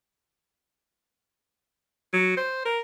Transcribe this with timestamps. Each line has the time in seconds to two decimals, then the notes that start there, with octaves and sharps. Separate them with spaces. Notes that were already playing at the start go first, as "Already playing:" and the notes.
2.13 F#3
2.37 C5
2.65 A#4